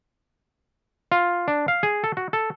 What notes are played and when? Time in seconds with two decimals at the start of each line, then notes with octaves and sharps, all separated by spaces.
1.12 F4
1.48 D4
1.68 F5
1.83 G#4
2.04 A4
2.17 F#4
2.33 A4